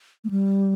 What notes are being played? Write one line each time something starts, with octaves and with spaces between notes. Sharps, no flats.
A3
G3